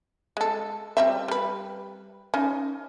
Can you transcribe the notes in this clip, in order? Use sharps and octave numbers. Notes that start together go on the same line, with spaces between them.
G#3 A4
G3 C4 E5
G3 B4
C#4 D#4